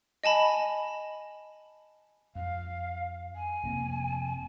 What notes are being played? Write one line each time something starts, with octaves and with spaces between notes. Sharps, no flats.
D#5 G#5 A5 B5
F2 F5
G#5
F1 A#3 C4